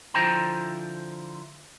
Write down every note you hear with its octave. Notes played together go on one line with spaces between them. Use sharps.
D3 F3 E4 C5 G5 A#5